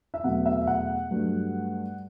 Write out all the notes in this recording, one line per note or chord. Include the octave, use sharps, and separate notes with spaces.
E5
E2 B2 F#3 A3 F#5
E5
E5
F#5
G2 F#3 A3